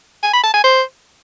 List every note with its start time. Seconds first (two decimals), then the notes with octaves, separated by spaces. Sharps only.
0.23 G#5
0.33 B5
0.43 A5
0.54 G#5
0.64 C5